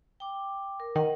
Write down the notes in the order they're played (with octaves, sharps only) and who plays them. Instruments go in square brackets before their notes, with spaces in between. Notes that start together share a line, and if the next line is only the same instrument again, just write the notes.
[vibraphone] G5 D6
A#4
[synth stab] D#3 [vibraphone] A#4 D#5 F#5